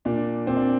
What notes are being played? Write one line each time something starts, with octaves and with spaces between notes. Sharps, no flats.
A#2 D4
A#2 C4
D4